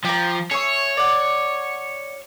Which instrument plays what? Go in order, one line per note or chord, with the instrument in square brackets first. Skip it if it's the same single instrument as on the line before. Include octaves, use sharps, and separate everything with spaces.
[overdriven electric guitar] F3 [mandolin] G4 A#5
[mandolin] G#4 E5 C#6 [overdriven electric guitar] C#5
[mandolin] D5 F#5